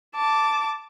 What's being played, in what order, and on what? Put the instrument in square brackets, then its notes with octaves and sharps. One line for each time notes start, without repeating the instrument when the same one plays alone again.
[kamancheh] A5 D6